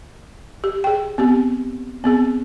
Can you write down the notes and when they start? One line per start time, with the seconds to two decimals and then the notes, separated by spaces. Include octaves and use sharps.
0.64 G4
0.84 G#4 G5
1.18 B3 C4 G4
2.04 B3 C4 G#4